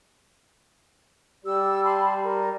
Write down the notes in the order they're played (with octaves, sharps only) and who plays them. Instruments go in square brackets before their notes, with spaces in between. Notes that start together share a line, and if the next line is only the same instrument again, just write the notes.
[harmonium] G3 [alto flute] G4 [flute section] E6
[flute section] A5 B5 C6
A#4